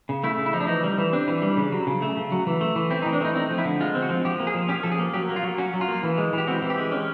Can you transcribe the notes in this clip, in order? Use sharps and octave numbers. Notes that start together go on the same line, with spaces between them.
C#3
A3 E4
C#3
E4
F3 D#4
D4
E3 D#4
G3
E3
C4 D4
E3
G3
C#3
F#3
C#3
A3
C#3
F#3
E3
A3
E3
C4 E4
D#4
E3
D4
A3 D#4
C4 D#4
F3
E4
D3
G#3 F4
C4
F#4
F3
F3 G4
A#3
G#4
F3
C#4 G4
F3 A4
G#4
A#3
F#3 G4
A#3
F4
F#3
C#4 F#4
F#3
F4
A#3
E3
G#3
E3
G4
C4 F#4
E3
G4
G#3
C#4